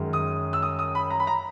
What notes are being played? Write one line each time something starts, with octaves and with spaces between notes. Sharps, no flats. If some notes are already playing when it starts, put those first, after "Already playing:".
Already playing: F#2 D#3 G#3 C#4
D#6
E6
D#6
D#6
B5
A#5
B5
A#5